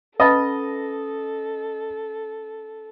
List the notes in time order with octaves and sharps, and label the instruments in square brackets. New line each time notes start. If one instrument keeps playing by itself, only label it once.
[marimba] C#4 F#5 A6 [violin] A4 [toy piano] B4 A5 B5 [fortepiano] D#5